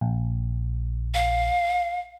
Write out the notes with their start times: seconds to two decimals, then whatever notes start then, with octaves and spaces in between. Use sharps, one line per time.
0.01 A#1
1.14 F5